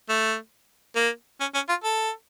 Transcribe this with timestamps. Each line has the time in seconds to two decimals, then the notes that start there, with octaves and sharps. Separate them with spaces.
0.09 A3
0.96 A#3
1.41 C#4
1.55 C#4
1.69 F4
1.84 A4